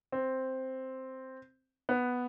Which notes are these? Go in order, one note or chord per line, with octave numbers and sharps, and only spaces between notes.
C4
B3